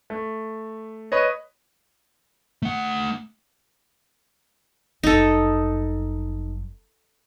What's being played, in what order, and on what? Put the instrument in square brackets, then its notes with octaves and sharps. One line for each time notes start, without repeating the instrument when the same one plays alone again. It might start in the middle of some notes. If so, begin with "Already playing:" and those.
[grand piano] A3
B4 C#5 D#5
[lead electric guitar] A3 F#5
[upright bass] G1 F#2 [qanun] D#4 A4